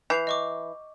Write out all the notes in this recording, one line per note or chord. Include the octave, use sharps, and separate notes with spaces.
E3 G6 C7 F7
D#5 C#6 D6